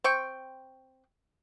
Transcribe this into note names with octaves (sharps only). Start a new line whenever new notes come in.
C4 G5 C#6